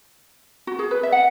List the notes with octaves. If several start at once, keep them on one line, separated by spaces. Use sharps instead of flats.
F#4
G#4
B4
E5
F#5